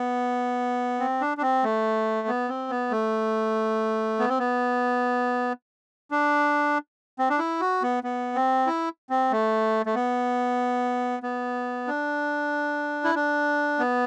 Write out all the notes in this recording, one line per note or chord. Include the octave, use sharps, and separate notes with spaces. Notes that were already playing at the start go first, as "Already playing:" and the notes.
Already playing: B3
C4
D4
D4
C4
A3
B3
C4
B3
A3
B3
C4
B3
D4
C4
D4
E4
F#4
B3
B3
C4
E4
C4
A3
A3
B3
B3
D4
E4
D4
B3